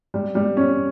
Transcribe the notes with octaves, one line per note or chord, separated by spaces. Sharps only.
G3
G3
C#4